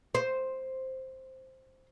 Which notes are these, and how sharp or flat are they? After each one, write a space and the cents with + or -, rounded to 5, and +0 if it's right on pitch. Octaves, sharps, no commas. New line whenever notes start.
C5 +0